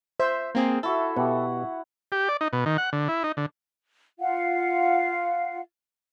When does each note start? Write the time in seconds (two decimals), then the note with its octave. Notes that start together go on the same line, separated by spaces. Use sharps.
0.20 C5 E5
0.55 A#3 C4 G#4
0.83 E4 F#4 A4 E5
1.16 B2 G4 F#5
2.12 G4
2.29 D5
2.41 D#4
2.53 B2
2.66 D#3
2.78 F#5
2.93 D3
3.08 E4
3.24 D#4
3.37 D3
4.20 F4 F5 F#5